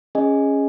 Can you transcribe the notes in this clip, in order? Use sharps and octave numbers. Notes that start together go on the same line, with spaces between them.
C#4 G#4 D#5 G#5